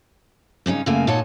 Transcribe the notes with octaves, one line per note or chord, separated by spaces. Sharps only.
G2 C#3 C#4 D#4
F#2 C#3 A3 A#3 F5 G#5
A#2 D#4 F#4 C#5 D#5 A5